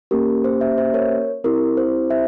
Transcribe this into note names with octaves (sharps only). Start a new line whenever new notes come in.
A#3 C#4 G4 A#4
C5
C5 E5
C5 E5
A#4 C#5
C4 E4 G4 A#4
C5
C5 E5